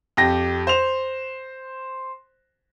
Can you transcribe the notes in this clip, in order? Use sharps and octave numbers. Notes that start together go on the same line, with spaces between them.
F2 G4 A#6
C5 F7